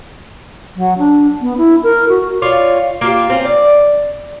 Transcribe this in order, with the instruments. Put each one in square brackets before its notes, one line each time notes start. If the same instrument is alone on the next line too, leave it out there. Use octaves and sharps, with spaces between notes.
[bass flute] F#3
D4
B3
E4
A#4
F#4
[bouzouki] F4 C#5 D5
A#3 F4 G4
C4 C#4 F4
D5